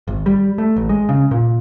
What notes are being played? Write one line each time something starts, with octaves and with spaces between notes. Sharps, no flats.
G#1
G3
A3
A1
G#3
C#3
A#2